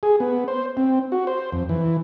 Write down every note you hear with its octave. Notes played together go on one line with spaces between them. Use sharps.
G#4
B3
C5
C4
F#4
C5
F2
E3